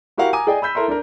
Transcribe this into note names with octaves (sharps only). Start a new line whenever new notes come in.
E4 F#4 G4 A#4 F5 F#5
G#5 A#5 D6 D#6 D#7
G#4 D5 D#5 G5 G#5
B5 E6 G6 B6
E4 A4 A#4 E5 C6
D4 A#4